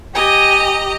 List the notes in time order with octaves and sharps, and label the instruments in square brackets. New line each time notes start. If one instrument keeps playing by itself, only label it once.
[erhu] G4 [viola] D#5 A#5 [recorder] G#5